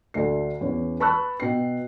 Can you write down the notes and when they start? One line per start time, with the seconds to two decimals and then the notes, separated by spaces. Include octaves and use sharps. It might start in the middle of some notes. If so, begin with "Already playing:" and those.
0.14 D2 D3 A3 C7
0.61 E2 C#4 C#5
1.00 B4 A5 B5 C#6 E6 F#6
1.40 B2 G5 C7